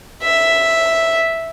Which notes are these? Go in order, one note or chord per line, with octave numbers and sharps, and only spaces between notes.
E5